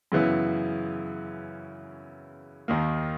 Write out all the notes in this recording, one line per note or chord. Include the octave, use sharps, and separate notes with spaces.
F#2 C#3 E3 B3 E4
D#2 D#3 A#3